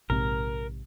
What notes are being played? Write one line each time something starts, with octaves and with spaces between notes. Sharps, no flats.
A#1 G#2 C3 A#4